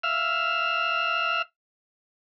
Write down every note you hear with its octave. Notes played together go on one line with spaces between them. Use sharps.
E5 F5 E6 F6